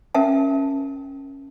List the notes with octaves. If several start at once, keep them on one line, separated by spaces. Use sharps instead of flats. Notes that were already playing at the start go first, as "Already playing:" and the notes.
C#4 A#4 E5 A5